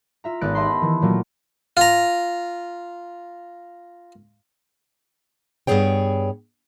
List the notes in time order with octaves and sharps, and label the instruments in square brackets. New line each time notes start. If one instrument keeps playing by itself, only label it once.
[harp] F4 E5 A#5
G#1 B3 D#4 F#6 A6 D7
G4 D#5 E5 A5 B5 C6
D#3 E3
A#2 F#3 A3 A#3
[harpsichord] F4 A#5
[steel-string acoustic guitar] G2 F3 B3 G#4 C#5 G5